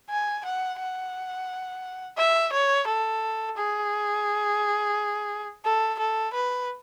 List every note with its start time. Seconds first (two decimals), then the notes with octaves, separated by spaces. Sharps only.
0.10 G#5
0.45 F#5
0.80 F#5
2.18 E5
2.53 C#5
2.87 A4
3.57 G#4
5.65 A4
5.99 A4
6.34 B4